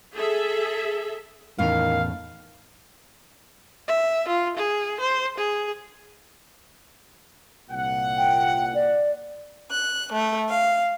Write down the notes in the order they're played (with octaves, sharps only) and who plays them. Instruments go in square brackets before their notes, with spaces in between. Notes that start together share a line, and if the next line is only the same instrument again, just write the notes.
[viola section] G#4 A4 E5
[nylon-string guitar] E2 A2 C#4 [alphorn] D#3 [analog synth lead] F5
[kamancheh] E5
F4
G#4
C5
G#4
[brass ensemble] C2 A#2 F#5
[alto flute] G5
D5
[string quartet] F#6
A3
F5